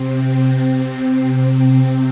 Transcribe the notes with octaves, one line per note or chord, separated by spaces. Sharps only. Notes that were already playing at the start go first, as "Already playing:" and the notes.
Already playing: C3 C4
C3 C4